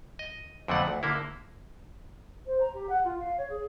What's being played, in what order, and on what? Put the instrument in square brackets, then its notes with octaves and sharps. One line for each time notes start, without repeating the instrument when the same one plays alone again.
[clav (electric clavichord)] D#5
F2 B2 D3 F#3 A3 F#5
D2
D3 A#3 E4
[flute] C5
A#5
G4
F#5
F4
F5
C#5
G#4